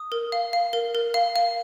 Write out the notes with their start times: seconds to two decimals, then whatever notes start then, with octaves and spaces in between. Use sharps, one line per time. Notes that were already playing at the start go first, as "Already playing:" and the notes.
Already playing: D#6
0.12 A#4
0.32 F5
0.53 F5
0.73 A#4
0.95 A#4
1.14 F5
1.36 F5